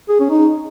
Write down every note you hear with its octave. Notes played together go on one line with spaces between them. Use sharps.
G#4
C#4
D#4